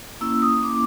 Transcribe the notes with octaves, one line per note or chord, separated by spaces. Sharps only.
A#3 C#4 E4 E6
D#6
D6